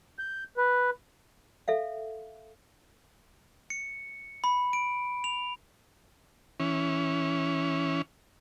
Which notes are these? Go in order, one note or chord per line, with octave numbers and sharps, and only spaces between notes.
G6
B4
A4 E5 F5
C#7
B5
D7
F7
E3 C#4